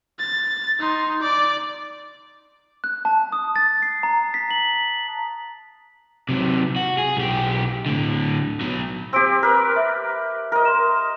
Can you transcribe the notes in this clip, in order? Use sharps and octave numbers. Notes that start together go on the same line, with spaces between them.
A6
D#4 C6
D5 D6
F#6
A5
D#6
A6
C7
A#5
B6
F#7
C3 F#3
F#4
G#4
B1 G4
A2 D3
B2 F#3
C4 G4 E6 D7
A#4 B4
E5
A#4 D#5
C6 E7